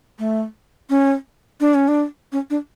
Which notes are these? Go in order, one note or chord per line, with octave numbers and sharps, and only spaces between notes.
A3
C#4
D4
C#4
D4
C#4
D4